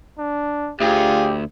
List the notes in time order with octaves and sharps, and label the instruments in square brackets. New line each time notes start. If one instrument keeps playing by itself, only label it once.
[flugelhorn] D4
[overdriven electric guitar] D2 [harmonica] F4 G#4 [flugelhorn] G4